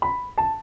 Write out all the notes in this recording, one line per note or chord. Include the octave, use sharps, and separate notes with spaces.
B5
A5